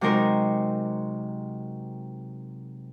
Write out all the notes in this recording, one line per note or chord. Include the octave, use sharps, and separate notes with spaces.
C3 F#3 G#3 D#4 A#4 C5